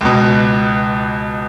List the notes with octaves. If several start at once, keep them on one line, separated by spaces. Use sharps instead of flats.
C#2 B2